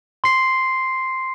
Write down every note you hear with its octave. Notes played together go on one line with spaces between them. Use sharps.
C6 C7